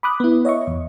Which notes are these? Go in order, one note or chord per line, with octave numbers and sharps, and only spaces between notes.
B5 D6 D#6 F#6
B3 E4
C#5 D#5 E5 C#6
E2